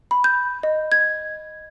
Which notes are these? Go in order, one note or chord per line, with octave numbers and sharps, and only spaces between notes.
B5
G6
D#5
G#6